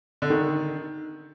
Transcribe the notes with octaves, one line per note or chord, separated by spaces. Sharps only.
D3
D#3